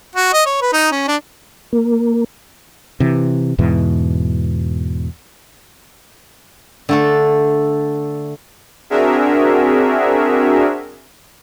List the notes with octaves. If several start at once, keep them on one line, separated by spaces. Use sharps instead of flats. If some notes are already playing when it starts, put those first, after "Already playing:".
F#4
D#5
C#5
B4
D#4
C#4
D4
A#3
C3 E3
E2 G#2 B2 E3
D3 A3 A4
C4 D4 F#4 G#4 A#4 E5